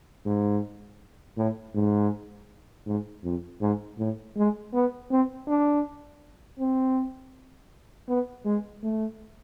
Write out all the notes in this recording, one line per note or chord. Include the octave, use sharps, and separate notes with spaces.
G#2
A2
G#2
G#2
F2
G#2
A2
G#3
B3
C4
D4
C4
B3
G#3
A3